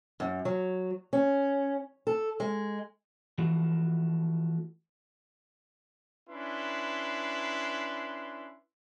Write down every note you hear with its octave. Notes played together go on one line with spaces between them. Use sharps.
F#2
F#3
C#4
A4
G#3
E3 F3 A3 F#4
C#4 D4 E4 B4 C6